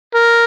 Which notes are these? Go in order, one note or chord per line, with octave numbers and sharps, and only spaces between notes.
A#4